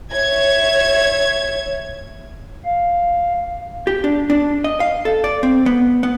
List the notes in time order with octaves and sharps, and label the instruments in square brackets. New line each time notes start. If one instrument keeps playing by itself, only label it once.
[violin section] C#5 E5 G#6
[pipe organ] F5
[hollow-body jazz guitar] G4
D4
D4
D#5
F5
A4
D5
C4
B3
B3